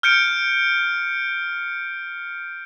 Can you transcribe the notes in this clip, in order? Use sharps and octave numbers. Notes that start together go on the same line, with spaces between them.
F6 G6 C#7 D7